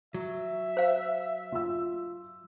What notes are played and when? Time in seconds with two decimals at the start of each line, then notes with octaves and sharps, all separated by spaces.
0.14 F#3 E5
0.77 C5 F5
1.52 F4 E6